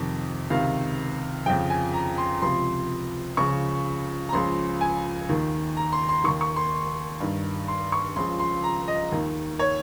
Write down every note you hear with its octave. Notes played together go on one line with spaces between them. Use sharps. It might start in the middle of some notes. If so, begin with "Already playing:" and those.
Already playing: F2 C3 D#3
C#2 C3 D#3 F5
F2 C#3 F3 G5
G#5
A#5
C6
C#2 C3 F3 C6
C#2 C#3 F3 C#6
A#5
C#2 C#3 F3 C6
G#5
D#2 D#3
A#5
C6
C6
D#2 D#3 C#6
C#6
C6
G2 D#3
C6
C#6
C#2 C#3 F3 C6
C6
A#5
D#5
D#2 D#3
C#5